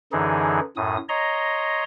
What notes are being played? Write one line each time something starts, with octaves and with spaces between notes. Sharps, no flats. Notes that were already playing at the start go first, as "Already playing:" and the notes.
F#2 D3 E3 D#4 G#4
F#2 A2 D#6
C#5 D#5 A#5 C6